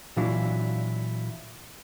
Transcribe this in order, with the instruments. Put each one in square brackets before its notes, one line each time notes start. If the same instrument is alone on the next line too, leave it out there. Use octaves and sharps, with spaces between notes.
[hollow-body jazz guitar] A#2 E3 F#3 D4 E4 F4